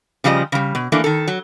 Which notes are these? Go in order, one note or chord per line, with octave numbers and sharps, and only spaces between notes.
C#3 F3 G3 F#4 D#5
C#3 G3
B2
E3 A3 A#3 D4
D#3 A4
F#3